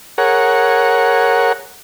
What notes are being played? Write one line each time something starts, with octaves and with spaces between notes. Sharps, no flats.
G#4 A#4 C#5 F#5